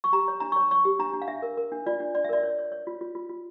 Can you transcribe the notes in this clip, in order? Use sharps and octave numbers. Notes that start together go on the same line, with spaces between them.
C#6
G4 A#5
C#5
D4 A#5
C#5 C#6
C#5 C#6
G4
D4 A#5
D4
F5
D4 E5
A#4
A#4
D4
F4 D5
D4
D4 D5
E5
A#4 D5
C#5
C#5
C#5
F4
F4
F4
F4